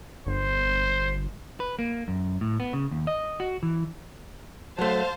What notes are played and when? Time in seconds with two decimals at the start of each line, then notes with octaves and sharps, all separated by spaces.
0.27 G1 C5
1.60 B4
1.79 A#3
2.08 F#2
2.41 A2
2.60 B3
2.73 C#3
2.91 D#2
3.07 D#5
3.40 F#4
3.63 E3
4.79 F#3 A3 C5 F5 A5